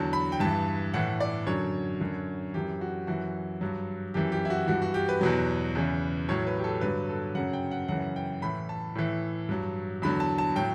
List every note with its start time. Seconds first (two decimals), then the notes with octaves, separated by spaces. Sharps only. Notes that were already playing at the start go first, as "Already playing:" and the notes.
Already playing: E2 D3 F#3 A5
0.13 B5
0.32 G5
0.40 G2 E3 A5
0.94 A2 E3 F#5
1.20 D5
1.47 F#2 D3 F#3 C#5
2.01 F#2 D3 F#3
2.54 F#2 E3 G4
2.81 F#4
3.07 F#2 E3 F#4
3.61 G2 F#3
4.14 F#2 E3 G4
4.32 G4
4.45 E4
4.50 F#4
4.67 G2 E3 F#4
4.82 F#4
4.94 G4
5.09 B4
5.21 E2 B2 F#3
5.75 E2 C#3 E3
6.29 A2 F#3 C#5
6.47 B4
6.58 G4
6.64 A4
6.81 G2 D3 F#3 B4
7.09 A4
7.35 F#2 C#3 F#3 F#5
7.53 G5
7.71 F#5
7.88 F#2 C#3 E3 F#5
8.16 G5
8.42 A2 E3 B5
8.69 A5
8.95 A2 E3
9.49 G2 F#3
10.02 E2 D3 F#3 B5
10.20 A5
10.38 A5
10.55 A2 F#3 G5